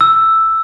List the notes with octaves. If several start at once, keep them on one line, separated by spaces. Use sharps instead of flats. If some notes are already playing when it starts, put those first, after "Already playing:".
E6